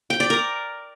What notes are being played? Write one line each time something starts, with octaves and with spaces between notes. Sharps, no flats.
G5
D5
A#4